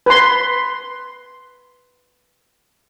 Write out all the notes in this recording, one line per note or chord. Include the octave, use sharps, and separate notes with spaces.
B4 C6